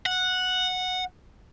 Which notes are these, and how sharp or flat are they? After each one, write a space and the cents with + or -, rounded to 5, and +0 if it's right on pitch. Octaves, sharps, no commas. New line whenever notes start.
F#5 -10